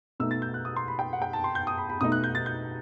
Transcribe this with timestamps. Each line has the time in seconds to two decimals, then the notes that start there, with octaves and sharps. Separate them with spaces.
0.20 B2 A3 D#4 E6
0.31 A6
0.42 G6
0.54 F#6
0.65 D#6
0.76 C6
0.88 B5
0.99 G5
1.13 F#5
1.22 G5
1.33 A5
1.44 C6
1.55 G6
1.67 D#6
1.78 B5
1.89 B5
2.01 B2 A3 D#4 D#6
2.12 F#6
2.24 G6
2.35 A6
2.46 G6